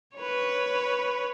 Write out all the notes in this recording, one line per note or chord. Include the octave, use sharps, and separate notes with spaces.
B4 C#5